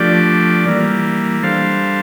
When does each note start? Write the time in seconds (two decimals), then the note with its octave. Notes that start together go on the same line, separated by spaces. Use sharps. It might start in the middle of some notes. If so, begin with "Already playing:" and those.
Already playing: F3 A3 D4 G4 D5
0.66 E3 G3 A#3
1.43 G3 D4 A4 C5 F5